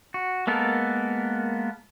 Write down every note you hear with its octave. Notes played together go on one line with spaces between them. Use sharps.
F#4
G#3 A#3 B3 A4 A#4